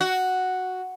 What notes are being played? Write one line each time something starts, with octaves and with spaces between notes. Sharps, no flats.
F#4